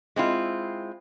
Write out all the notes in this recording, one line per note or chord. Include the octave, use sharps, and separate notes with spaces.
G#3 C4 E4 F4